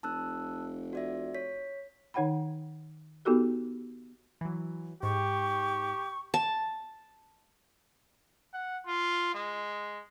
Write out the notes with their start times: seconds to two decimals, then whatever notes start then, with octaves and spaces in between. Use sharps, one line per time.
0.03 F1 A5 E6 F#6
0.93 F#4 D5 E5
1.35 C#5 B6
2.14 D#3 D#4 C#5 F#5 G5 B5
3.25 B3 D#4 F#4 G4 A4 A#4
4.41 E3 F#3
5.03 G#2 G4 C#6
6.34 A5
8.53 F#5
8.87 F4
9.34 G#3